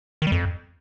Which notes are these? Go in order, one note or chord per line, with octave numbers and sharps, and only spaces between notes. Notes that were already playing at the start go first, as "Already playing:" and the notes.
D#3
G3
F2